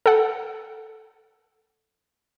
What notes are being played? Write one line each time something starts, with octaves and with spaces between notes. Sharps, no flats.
A4 F#5